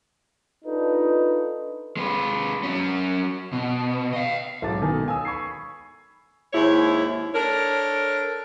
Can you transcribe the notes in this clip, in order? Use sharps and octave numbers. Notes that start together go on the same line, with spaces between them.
D4 D#4 F4 A4 B4
G#3 B4
F#3 C#4
B2
D#5 F5
B1 G#2 F#3 D6 A6
B2 D#3 A4 G#5
F5 G#5 D#6 E6
B5 C#6 G#6 C7
D#2 G#2 E4 C#5
D4 A4 A#4 C#5